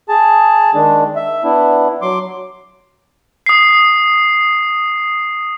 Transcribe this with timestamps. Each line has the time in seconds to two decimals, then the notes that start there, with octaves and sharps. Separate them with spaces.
0.09 G#4 A5
0.74 D#3 G#3 D4
1.16 E5
1.44 B3 D4 E4
2.02 F#3 C6 D6
3.46 D#6 C7